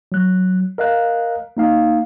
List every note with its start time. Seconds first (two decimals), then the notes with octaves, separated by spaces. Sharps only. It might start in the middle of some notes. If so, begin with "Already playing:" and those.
0.12 F#3 F#6
0.78 A#4 D#5 F5 F#6
1.57 A#3 D#4 F5